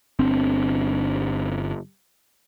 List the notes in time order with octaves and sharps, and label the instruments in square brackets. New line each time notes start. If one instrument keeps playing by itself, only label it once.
[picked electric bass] G1 C4 D4